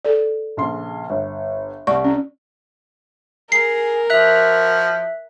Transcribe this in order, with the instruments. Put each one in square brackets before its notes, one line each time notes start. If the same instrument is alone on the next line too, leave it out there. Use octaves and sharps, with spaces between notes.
[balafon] A4 D5
[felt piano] A#1 C#3 C6
G1
[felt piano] C2 [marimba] D5 [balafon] C#6
[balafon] C#4
[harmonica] G#4 [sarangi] A#4 [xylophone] C7
[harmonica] F3 F#4 [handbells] E5 F#6